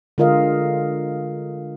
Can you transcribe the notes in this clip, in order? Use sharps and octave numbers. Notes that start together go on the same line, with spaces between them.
D3 G#3 F4 A#4 D#5 F5